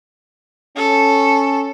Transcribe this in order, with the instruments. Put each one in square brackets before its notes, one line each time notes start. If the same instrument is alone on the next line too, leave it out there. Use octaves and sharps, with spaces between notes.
[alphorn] C#4 [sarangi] A4